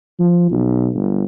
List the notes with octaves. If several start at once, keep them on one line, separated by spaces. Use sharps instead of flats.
F3
B1
G1